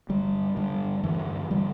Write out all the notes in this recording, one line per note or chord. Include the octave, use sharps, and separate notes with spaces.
G2 D3 G3
G2 D3 G3
G2 D3 E3
D3 G3